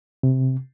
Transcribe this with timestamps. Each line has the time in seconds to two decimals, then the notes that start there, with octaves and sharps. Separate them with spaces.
0.23 C3